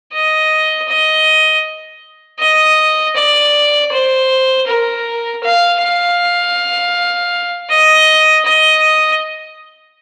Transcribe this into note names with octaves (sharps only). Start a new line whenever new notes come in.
D#5
D#5
D#5
D5
C5
A#4
F5
F5
D#5
D#5